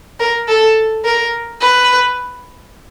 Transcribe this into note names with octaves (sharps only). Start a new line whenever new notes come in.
A#4
A4
A#4
B4